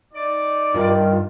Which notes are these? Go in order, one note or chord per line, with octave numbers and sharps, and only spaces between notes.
D#4 D5
G2 D#3 F4